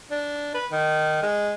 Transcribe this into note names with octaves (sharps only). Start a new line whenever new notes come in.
D4
B4
D#3
G#3